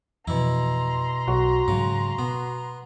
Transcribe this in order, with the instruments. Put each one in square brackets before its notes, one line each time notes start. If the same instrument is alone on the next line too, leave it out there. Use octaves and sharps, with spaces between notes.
[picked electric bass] F2 E3 [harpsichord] B2 E4 [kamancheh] A#5 C6
[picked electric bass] B1 [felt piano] F#4
[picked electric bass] G#2 F#3 [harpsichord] C#3
[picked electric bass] B2 [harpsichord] B3